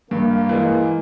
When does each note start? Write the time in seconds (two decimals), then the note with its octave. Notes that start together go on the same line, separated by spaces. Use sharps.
0.11 G2 A#3
0.49 E3 G#3